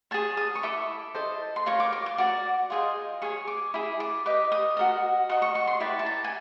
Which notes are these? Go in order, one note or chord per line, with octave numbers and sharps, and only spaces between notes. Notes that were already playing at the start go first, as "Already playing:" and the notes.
G#4 C#5 A5
D#6
C#6
E4 A4 D6
E4 A4 C5 D#5
C6
F4 A#4 C#5 C#6
D6
D6
D6
F#4 A#4 D5 D6
F4 G#4 C5 D#5
G#4 C#5 C#6
D6
E4 G#4
D6
G4 B4 D#5 D6
D#6
F#4 A#4 D#5
F#4 A#4 D#5 C#6
C#6
C#6
C6
E4 G4 B4 D5
A5
A#5
G#5